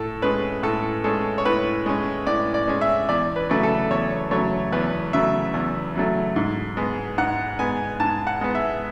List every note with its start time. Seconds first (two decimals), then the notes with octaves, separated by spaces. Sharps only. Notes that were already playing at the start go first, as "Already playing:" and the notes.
Already playing: A2 A4
0.22 G#3 C#4 B4
0.63 A2 A4
1.04 G#3 C#4 A4
1.38 C#5
1.45 A2 B4
1.86 G#3 C#4
2.27 A2 D5
2.54 D5
2.68 G#3 C#4
2.81 E5
3.09 E2 D5
3.36 B4
3.50 C#3 F#3 A3
3.63 A4
3.90 E2 C#5
4.31 C#3 F#3 A3 C#5
4.72 E2 B4
5.13 C#3 F#3 A3 E5
5.54 E2
5.95 C#3 F#3 A3
6.36 G#2
6.77 G#3 B3
7.18 G#2 F#5
7.59 G#3 B3 G#5
8.00 G#2 A5
8.27 F#5
8.41 G#3 B3
8.55 E5